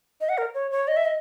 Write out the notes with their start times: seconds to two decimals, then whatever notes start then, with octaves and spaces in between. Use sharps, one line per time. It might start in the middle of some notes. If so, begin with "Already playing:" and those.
0.21 D#5
0.29 F#5
0.38 A#4
0.54 C#5
0.71 C#5
0.88 D#5
0.97 E5
1.05 D#5